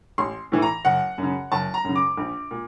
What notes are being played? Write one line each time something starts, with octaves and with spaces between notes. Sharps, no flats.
A1 C6
A2 E3
A#5
F#1 F#5
F#2 C#3
F#1 A5
A#5
F#2 C#3
D6
A#1
A#2